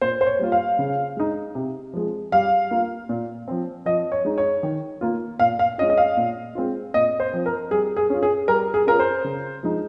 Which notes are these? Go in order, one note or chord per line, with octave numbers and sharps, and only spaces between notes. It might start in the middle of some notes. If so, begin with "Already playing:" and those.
A#2 C5
C5
C#5
G3 A#3 F4
F5
C#3
G#3 D#4
C3
F3 G#3
G3 F5
A#3 F4
A#2
F3 C4
F3 D#5
C#5
G#3 D#4
C#5
D#3
A#3 F4
A#2 F5
F5
G#3 C#4 F4 D#5
D#5
F5
A#2
G#3 C4 F4
A#2 D#5
C5
F3 C4
A#4
G3 G#4
G#4
C#4 F4
G#4
G3 A#4
G#4
C#4 F4 A#4
C5
C#3
F3 G#3 D#4